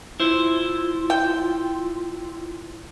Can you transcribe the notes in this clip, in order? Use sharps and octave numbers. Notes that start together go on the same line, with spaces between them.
E4 F4 C5
G5